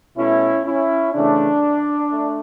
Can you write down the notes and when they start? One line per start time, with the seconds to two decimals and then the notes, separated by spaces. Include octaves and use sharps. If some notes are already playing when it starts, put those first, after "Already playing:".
0.17 B2 A3 C#4 E4
0.66 C#4 E4
1.14 C#3 E3 A3 D4
2.11 A3